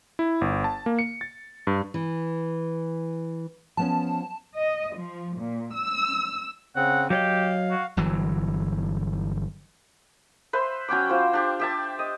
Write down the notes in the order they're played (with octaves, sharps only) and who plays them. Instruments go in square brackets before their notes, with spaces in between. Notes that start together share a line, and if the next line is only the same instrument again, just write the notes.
[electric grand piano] E4
G1
A5
A#3
C#7
A6
G2
[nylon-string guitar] E3
[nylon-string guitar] F3 B3 C#4 [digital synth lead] A5
[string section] D#5
F3
A#2
E6
[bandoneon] C#3 C4 [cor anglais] F#5
[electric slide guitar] F#3 C#5 D#5 [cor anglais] G4 [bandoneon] F5
[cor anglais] F#4
[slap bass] G1 E3 F#3
[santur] B4 C5 E5 C6
F#3 C#4 G5 D6
F4 C5
D4 G4
G4 E5 A5
D#5